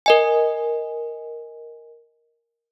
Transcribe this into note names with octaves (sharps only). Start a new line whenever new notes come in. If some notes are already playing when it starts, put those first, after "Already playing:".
A#4 D#5 G#5